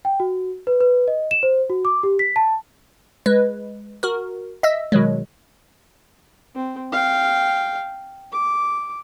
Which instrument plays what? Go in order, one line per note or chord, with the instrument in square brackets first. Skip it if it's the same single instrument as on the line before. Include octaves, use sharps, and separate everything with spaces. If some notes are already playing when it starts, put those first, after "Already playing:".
[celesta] G5
F#4
B4
B4
D#5
E7
C5
F#4
D6
G4
B6
A5
[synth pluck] G#3 B4
F#4 A#4
D#5 E5 E6
B2 D#3 F#3 G#3
[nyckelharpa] C4
F5 G5
D6